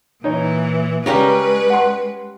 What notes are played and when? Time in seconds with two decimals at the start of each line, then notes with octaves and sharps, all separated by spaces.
0.24 A#2 E3 D#4 C#5
1.06 C#3 G3 G#3 C#4 A#4 B4
1.70 F#5 C6